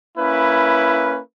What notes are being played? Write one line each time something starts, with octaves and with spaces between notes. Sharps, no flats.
A#3 C#4 E4 B4